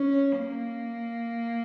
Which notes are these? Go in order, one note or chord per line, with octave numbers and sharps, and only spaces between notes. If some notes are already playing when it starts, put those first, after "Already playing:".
Already playing: C#4
A#3